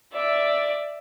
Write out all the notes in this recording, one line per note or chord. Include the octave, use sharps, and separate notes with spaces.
D5 E5